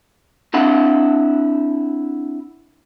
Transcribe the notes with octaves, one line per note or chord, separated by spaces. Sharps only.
C4 D4 E4 F#5